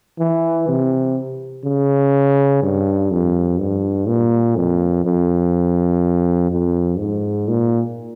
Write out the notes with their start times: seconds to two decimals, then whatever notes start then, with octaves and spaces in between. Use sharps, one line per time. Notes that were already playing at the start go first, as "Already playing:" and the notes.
0.19 E3
0.68 C3
1.65 C#3
2.62 G2
3.11 F2
3.59 G2
4.08 A#2
4.56 F2
5.05 F2
6.50 F2
6.99 G#2
7.48 A#2